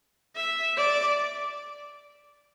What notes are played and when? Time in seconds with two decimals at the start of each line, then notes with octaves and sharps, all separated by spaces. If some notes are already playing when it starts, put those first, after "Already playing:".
0.36 E5
0.77 D5